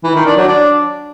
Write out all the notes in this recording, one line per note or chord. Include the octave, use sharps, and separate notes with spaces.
E3
D#3
D4
F#3
D4